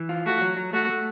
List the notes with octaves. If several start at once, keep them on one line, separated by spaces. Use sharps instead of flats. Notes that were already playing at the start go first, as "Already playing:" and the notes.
Already playing: E3
F4
A3 F#4
F#3
F#3
A3 F#4
A3